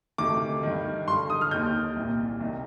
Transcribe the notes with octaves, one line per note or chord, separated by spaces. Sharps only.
D2 C3 D#3 D6
G2 D#3
G2 D3 C6
D#6
F6
D#2 D#3 G6
C2 A#2
C2 C3 D#3